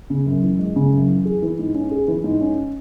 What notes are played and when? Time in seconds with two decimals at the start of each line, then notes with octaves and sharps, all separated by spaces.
0.10 C#3
0.26 F#2
0.42 E3
0.59 G#3
0.76 C#3
0.92 F#2
1.08 E3
1.25 G#4
1.42 E3
1.59 G#2
1.75 C#4
1.91 G#4
2.08 E3
2.24 G#2
2.41 C#4